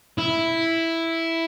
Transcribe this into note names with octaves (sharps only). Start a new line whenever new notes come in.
E4